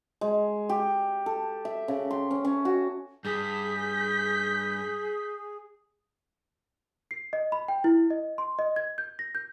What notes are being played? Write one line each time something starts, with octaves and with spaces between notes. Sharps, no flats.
G#3
G4
A4
E5
C#3
C6
C#4
C#4
F#4
G2 G#4 G6 B6
C7
D#5
B5
G5
E4
D#5
C6
D#5
G#6
G6
A#6
G6